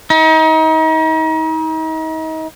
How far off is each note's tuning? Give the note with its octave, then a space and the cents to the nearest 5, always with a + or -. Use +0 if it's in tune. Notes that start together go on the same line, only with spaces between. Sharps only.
D#4 +35